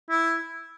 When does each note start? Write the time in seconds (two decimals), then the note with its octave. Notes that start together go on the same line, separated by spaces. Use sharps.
0.10 E4